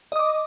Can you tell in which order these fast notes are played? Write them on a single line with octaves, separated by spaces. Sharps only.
D#5 D#6 D6